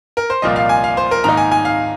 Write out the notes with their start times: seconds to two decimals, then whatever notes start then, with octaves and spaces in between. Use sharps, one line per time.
0.17 A#4
0.30 C5
0.42 C2 A#2 F3 A#3 F4 D#5
0.56 F5
0.69 G#5
0.84 F5
0.97 C5
1.11 A#4
1.24 G#2 D#3 A#3 D#4 A#5
1.37 G#5
1.52 G#5
1.65 F5